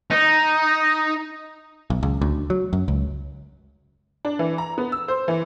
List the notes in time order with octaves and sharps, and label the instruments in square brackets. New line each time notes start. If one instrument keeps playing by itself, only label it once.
[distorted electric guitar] D#4
[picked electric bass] B1
C#2
D2
F#3
F#2
C#2
[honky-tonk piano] D4
E3
A#5
B3
E6
C5
E3